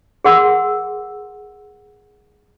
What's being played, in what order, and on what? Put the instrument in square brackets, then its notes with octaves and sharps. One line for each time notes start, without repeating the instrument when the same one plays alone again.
[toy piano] G#4 A#4 F#5 C6 E6